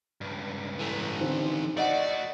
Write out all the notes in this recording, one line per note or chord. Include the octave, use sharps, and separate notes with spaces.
C#2 G2
E3 A3
D3 D#3 C4
A3 F#4 D5 D#5 F#5